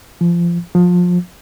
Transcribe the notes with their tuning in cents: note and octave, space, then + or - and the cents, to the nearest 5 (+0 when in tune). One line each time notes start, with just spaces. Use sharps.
F3 -25
F3 +25